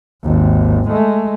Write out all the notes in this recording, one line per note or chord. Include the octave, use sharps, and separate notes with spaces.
G#1 D#2
G#3 A3